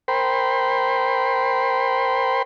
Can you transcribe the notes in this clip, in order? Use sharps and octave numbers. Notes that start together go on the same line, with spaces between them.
A#4 C5 G5 B5 C6